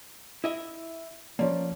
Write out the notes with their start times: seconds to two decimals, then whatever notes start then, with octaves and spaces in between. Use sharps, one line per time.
0.44 E4 D#5 E5
1.39 F3 A#3 C#4 D5